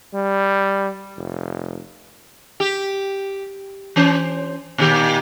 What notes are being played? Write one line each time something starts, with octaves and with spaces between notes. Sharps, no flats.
G3
F1
G4
E3 C#4 C5
A#2 D#3 G4